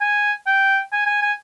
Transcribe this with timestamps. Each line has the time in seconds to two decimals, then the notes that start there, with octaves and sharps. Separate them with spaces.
0.01 G#5
0.47 G5
0.92 G#5
1.06 G#5
1.21 G#5